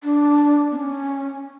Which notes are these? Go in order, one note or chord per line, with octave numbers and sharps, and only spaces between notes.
D4
B3
C#4